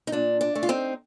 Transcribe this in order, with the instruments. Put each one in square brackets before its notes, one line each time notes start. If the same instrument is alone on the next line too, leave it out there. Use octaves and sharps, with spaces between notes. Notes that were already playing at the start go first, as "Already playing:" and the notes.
[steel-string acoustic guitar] D#4
A#2 D4
D4
A3
F4
C4 D#4